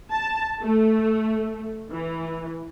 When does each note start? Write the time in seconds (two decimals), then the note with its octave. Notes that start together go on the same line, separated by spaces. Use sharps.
0.10 A5
0.61 A3
1.91 E3